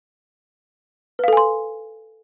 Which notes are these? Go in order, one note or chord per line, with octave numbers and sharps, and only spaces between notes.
A4 B4 F5 G#5 C6